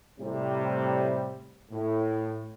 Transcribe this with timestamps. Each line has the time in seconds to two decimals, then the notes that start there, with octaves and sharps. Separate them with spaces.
0.20 A2 C3 G3
1.71 A2